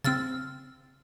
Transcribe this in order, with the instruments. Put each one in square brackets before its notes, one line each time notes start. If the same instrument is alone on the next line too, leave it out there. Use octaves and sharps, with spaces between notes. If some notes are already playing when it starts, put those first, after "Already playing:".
[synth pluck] C#3 C4 [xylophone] E6 F6 A6